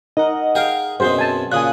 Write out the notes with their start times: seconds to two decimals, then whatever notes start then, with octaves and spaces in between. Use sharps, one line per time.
0.17 D#4 A#4 D#5 F#5
0.55 G#4 A#4 F5 G5 G#5
1.00 F#2 B2 C4 G#4 C5
1.18 G#5 A5
1.52 A#2 C#3 G#5 D#6 F#6